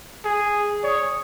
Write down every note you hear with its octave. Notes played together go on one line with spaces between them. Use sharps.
G#4
C#5 D5 D#6